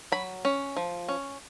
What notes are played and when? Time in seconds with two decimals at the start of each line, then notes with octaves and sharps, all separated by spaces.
0.12 F#3 B5
0.45 C#4
0.77 F3
1.08 C#4